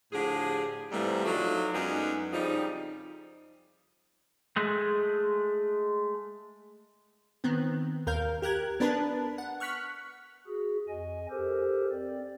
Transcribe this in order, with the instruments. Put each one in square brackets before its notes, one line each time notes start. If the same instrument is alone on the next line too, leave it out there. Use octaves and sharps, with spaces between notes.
[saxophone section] A2 D3 F3 G4 G#4
G#2 C3 E3 F3 G3 A3
F3 F#3 A3 D4 D#4 F4
F#2 G#3 B3 D4 D#4
F2 C#3 F3 G3 D#4
[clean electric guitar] G#3 A3
[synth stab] D#3 B3 C4
D#2 A#4 F5 G6
G4 A#4 F#6 G#6
B3 D4 A#4 B4 A5 B5
F#5
C#6 F6 F#6 B6
[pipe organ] F#4 G#4
F2 D#5 G#5
G4 A4 A#4 C5
C4 D5